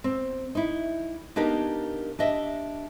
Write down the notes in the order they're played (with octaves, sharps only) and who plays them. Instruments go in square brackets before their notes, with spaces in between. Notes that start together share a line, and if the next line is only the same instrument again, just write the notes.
[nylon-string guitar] C4
D#4 E4
A#3 B3 D4 D#4 G4 A#4
D4 G4 D#5 E5